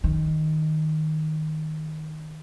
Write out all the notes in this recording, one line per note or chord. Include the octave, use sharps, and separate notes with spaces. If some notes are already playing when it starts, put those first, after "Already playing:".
D#3